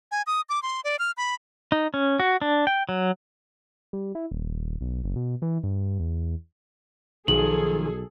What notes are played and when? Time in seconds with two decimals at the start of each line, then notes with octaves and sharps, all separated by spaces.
0.11 G#5
0.27 D#6
0.49 D6
0.63 C6
0.84 D5
0.99 F6
1.17 B5
1.72 D#4
1.94 C#4
2.20 F#4
2.42 D4
2.67 G5
2.89 F#3
3.93 G3
4.15 E4
4.31 D#1
4.81 B1
5.04 F#1
5.16 B2
5.42 E3
5.63 G2
6.00 E2
7.28 B1 D#3 F3 G#4 A4 F#7